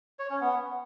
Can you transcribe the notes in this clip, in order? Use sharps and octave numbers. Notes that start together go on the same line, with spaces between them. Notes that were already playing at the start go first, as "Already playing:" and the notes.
C#5
C#4
B3